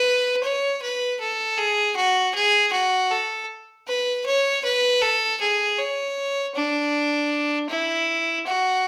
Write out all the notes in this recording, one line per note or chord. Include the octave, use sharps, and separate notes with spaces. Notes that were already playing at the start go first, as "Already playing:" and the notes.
Already playing: B4
C#5
B4
A4
G#4
F#4
G#4
F#4
A4
B4
C#5
B4
A4
G#4
C#5
D4
E4
F#4